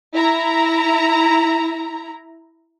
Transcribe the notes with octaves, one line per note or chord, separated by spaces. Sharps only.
E4 A#5